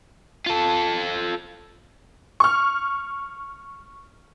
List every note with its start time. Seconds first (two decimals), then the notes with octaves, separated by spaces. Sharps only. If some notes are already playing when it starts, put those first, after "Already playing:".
0.46 F4 A4
2.40 C#6 F6